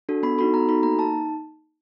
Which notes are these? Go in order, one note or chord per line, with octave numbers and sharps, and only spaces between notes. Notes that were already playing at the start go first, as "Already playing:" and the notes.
D4 F#4 A4
B3 B5
D#4 F#4 A4 B5
B3 A#5
D#4 F#4 A4 B5
A#3 A#5
D#4 A5